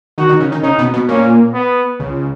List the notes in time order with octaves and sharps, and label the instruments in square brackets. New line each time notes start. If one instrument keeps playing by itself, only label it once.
[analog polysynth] D#3 D#4 [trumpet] F#4
[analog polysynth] D#3 D#4
C#3 C#4
D#3 D#4
[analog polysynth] C#3 C#4 [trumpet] D#4
[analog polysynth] B2 B3
B2 B3
[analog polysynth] A#2 A#3 [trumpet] C#4
[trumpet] B3
[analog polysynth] C#2 C#3